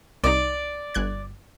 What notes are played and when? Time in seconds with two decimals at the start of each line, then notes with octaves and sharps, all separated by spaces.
0.24 C2 D#4 D5
0.94 G1 F#6 G#6